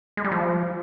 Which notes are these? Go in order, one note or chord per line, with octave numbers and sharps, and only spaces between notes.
G#3
G3
F3